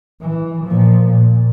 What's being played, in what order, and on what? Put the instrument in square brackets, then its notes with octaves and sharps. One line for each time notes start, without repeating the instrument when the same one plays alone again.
[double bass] E3
A#2 F3
A#2